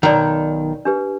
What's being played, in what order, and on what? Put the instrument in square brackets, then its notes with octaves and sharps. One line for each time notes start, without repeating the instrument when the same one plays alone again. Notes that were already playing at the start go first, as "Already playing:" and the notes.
[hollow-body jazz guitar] B1 D#3 [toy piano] C#5 D5
[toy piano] D4 G4 B4